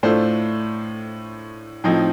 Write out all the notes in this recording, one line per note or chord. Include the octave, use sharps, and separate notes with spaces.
A2 A3 D4 F4 C5
A2 F3 C4 D#4